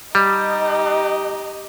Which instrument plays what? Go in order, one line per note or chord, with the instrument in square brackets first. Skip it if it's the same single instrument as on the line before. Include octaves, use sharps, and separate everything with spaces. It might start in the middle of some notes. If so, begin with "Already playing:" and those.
[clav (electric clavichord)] G3 [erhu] D#4 [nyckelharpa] G4 D#5